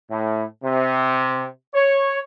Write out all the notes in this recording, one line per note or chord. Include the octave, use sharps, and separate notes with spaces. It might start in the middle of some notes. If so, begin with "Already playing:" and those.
A2
C3
C#5